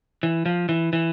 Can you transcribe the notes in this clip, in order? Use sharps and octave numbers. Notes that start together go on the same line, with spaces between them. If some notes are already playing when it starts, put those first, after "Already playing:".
E3
F3
E3
E3